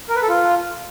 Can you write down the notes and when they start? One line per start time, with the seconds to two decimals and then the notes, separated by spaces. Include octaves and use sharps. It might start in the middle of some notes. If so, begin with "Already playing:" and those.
0.09 A#4
0.16 B4
0.22 A4
0.29 F4